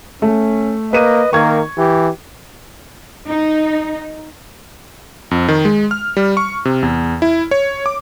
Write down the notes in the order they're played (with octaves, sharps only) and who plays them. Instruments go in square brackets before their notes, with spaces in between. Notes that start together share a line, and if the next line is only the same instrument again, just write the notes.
[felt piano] A3 [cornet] C#4
[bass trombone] A#3 [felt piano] B4 D#7 [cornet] D#5
[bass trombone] D#3 [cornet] A#3 [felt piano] C#6 G#6
[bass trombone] E3 [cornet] G4
[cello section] D#4
[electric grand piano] F2
D#3
G#3
F6
G3
C#6
C3
E2
E4
C#5
D6